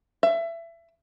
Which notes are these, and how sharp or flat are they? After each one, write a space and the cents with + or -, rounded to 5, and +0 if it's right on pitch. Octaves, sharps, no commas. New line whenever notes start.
E5 +25